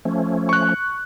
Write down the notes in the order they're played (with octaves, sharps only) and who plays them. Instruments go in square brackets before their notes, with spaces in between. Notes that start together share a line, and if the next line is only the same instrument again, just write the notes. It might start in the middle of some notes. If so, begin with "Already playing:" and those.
[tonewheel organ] F3 A3 C#4
[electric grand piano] C#6 F#6